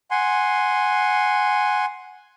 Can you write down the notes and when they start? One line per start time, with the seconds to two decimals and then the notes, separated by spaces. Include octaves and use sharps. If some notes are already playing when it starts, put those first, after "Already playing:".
0.11 F#5 G#5 C6